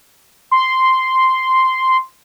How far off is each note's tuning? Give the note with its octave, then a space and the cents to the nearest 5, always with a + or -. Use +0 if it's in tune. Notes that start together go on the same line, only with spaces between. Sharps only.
C6 -5